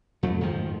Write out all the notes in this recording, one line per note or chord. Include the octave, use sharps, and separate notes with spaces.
F2 A3
G#2 D#3 F3